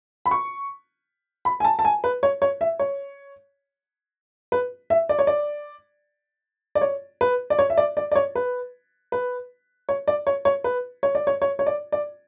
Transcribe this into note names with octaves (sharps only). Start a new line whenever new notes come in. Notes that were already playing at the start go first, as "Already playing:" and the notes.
B5
C#6
B5
G#5
A5
A5
G#5
B4
C#5
C#5
E5
C#5
B4
E5
D5
C#5
D5
D5
C#5
B4
D5
C#5
E5
D5
D5
D5
C#5
B4
B4
C#5
D5
C#5
C#5
B4
C#5
D5
C#5
C#5
C#5
D5
D5